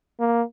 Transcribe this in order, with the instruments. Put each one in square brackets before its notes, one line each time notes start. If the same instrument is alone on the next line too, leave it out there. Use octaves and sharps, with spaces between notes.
[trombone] A#3